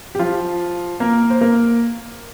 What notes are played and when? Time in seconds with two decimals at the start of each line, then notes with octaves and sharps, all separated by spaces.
0.15 G4
0.19 F3 F4
1.00 A#3 A#4
1.30 C5
1.41 A#3 A#4